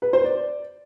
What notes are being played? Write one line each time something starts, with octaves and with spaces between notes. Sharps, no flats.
B4
C5
D5